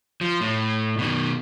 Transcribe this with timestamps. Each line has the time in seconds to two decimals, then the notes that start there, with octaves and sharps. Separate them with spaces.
0.21 F3
0.41 A2
0.99 B2 D#3